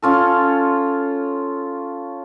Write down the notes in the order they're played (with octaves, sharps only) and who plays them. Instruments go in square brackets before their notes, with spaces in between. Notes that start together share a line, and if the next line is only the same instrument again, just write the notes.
[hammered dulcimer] C#4 F4 A4